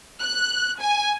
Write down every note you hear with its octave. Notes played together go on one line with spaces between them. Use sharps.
F#6
G#5